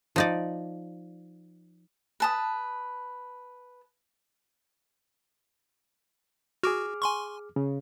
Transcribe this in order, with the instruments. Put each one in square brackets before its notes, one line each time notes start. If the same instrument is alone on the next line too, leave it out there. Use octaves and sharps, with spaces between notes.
[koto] F3 D#4 D5
[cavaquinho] B4 A5 D#6
[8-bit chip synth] F#4 [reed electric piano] G#4 D6 F6
[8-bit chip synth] G#5 C6 C#6
[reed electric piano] C#3